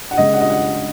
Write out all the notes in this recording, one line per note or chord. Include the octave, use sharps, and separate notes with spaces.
F#5
C#3 G#3 D#5
F#5
D#5
F#5